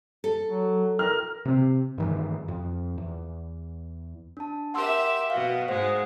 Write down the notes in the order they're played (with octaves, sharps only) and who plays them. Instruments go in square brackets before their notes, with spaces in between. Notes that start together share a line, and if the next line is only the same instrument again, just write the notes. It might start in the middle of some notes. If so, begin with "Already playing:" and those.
[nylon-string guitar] A4
[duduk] F#3
[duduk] A#4 [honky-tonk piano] F6
[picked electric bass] C3 C4
G2 D#3 E3
F2
E2
[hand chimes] D4 A5
[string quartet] G4 A#4 E5 [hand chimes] F#5 C6 E6
[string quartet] B2 F#4 [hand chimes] F5
[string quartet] G#2 G#3 [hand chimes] C5 F#5